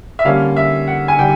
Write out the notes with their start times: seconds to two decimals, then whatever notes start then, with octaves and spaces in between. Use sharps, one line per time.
0.19 E5
0.25 D3 G3 A#3 C#4 F5
0.56 E5
0.88 F#5
1.08 G#5
1.19 D3 G3 G5